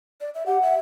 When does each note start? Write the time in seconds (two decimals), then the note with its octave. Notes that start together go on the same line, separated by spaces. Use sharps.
0.21 D5
0.35 E5
0.46 G4 F#5
0.62 E5